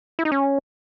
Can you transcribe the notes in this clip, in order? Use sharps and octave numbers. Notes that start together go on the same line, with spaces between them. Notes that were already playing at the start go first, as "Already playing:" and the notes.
E4
D#4
C#4